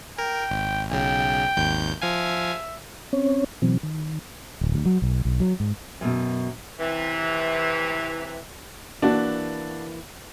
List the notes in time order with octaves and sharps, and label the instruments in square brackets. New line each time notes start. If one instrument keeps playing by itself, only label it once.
[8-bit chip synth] A#4 [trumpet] G5
[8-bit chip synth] G#1
[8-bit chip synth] B1 C#3 [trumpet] G5
[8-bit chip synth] G#1 D#2 G6
[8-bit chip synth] F3 F5 G#5 [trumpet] E5
[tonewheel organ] C4 C#4 C#5
B2 E3 F#3 C4
D#3
[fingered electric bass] D1
D2
F#3
B1
B1
F#3
G#2
[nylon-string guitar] F#2 B2
[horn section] C3 E3
[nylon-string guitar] E3 A#3 [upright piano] D4 F#4